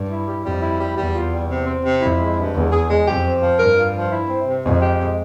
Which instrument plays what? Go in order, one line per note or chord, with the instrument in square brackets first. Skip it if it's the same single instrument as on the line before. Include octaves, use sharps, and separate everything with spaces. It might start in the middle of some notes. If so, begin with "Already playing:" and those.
Already playing: [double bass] G2
[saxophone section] E4
G3
[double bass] F2 [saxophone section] G3
[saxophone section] E4
G3
[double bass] E2 [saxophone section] G3
[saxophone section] F4
G3
C3
C4
C3
[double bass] F2 [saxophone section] E4
[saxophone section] G#3
G2
[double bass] E2 [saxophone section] G#3
[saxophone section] G#4
G#3
[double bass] F2 [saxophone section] G4
[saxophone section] C4
F3
[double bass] G2 [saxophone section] A#4
[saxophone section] F4
F3
E4
C4
C3
[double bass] F2 [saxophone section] G#3
[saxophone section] G4
G#3